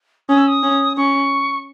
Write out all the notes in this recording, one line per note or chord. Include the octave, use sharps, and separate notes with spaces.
C#4 D#6
E6
D#6
C#4
C#4 C#6